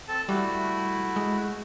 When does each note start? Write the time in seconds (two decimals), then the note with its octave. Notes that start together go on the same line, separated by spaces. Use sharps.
0.08 C4 A4 A5
0.29 G3 A3 E4 F#4
1.16 G#3